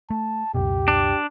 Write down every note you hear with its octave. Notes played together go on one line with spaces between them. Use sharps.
A3 A5
C#2 F#2 B2 G4
D4